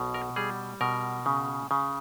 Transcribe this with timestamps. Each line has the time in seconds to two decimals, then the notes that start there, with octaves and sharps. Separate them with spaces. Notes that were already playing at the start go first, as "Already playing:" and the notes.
Already playing: B1 B2
0.14 A#4
0.36 G3 G#4
0.81 B2 A#4
1.26 C#3
1.71 C#3